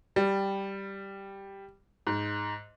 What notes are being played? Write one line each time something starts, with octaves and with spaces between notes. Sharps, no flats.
G3
G#2